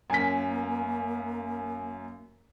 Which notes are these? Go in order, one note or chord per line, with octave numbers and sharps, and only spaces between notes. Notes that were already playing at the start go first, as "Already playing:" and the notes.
F#2 A#3 C#4 G#5 B6